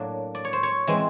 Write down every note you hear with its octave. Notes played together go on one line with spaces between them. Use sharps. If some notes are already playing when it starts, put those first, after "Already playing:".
Already playing: A2 F#3 A#3 D4
D5
C#5
C5
C#5
E3 G#3 C4